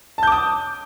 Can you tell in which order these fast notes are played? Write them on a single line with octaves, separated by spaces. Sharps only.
A5 G6 D6 D#6